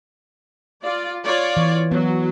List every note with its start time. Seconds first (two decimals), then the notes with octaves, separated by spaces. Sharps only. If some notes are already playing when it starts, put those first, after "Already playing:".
0.83 F4 D5
1.24 F4 C#5 D5
1.57 E3
1.91 F#3 B3